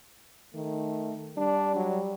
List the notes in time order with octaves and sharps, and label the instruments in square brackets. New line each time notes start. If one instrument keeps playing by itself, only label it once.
[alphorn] D#3 [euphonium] A3
[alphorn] G3 [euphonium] D4
[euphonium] F#3